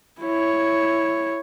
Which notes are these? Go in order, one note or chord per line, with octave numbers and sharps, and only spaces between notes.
E4 C#5